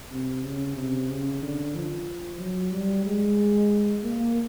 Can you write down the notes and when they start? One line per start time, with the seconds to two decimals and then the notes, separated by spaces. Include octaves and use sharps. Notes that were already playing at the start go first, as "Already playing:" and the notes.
0.11 C3
0.43 C#3
0.77 C3
1.09 C#3
1.42 D3
1.75 F3
2.40 F#3
2.72 G3
3.06 G#3
4.04 A#3